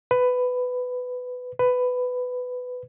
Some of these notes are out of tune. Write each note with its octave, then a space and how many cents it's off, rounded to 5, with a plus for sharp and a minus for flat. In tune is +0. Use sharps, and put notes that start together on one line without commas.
B4 +15
B4 +15